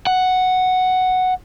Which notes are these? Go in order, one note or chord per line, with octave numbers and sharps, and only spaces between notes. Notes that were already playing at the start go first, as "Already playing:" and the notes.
F#5